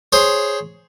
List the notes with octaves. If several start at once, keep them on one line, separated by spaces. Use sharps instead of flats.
G#4 C5 C#5